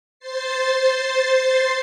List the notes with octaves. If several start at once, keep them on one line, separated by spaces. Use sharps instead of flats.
C5 A6 C7